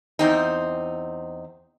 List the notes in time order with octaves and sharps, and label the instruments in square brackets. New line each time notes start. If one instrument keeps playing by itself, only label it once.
[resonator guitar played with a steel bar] E2 C4 D#4